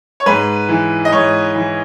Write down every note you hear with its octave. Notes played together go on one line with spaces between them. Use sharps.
C#5
G#2 B4
E3
D#5
G#2 C#5
E3